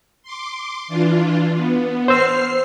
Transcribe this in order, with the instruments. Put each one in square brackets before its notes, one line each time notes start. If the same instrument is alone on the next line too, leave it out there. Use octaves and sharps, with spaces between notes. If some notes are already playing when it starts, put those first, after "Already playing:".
[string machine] C6 D6
E3 D4 F4
B3
[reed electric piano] C5 E6 [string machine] F6 C7